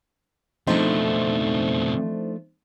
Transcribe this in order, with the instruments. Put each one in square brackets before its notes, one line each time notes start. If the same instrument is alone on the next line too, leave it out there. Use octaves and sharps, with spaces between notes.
[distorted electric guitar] F2 B2 [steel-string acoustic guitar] F3 A3 D4 [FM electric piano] C4 D#4 C5